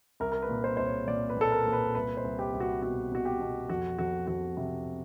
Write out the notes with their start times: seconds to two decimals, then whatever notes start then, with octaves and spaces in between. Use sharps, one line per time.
0.20 C2 A#4
0.32 A#4
0.42 B4
0.49 A#2
0.64 C5
0.77 C2 C5
0.86 C#5
1.07 A#2 D5
1.30 B4
1.37 A#2 A4
1.51 A#4
1.66 A#2
1.73 B4
1.95 C2 B4
2.17 C5
2.24 C2
2.39 G4
2.53 C2
2.60 F#4
2.82 B2 F#4
3.12 B2 F#4
3.25 G4
3.40 B2
3.69 F2 F#4
3.99 F2 F#4
4.27 F2 F#4
4.57 C3